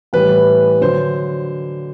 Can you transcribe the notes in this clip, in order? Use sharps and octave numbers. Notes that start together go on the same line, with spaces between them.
A2 E3 G3 B4
D3 F#3 C5